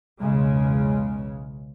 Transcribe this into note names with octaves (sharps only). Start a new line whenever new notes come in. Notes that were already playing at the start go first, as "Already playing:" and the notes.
B1 E2 C#3 G#3